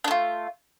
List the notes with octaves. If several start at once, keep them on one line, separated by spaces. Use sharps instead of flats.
A3 D4 F4